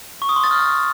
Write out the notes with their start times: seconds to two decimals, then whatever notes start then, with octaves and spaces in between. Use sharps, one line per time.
0.22 C#6
0.29 D#6
0.36 C6
0.44 A6
0.51 F6